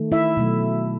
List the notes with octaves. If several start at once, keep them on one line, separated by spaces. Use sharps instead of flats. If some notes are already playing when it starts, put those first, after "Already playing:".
Already playing: D#3 A3
E4 E5
B2 F#3 A3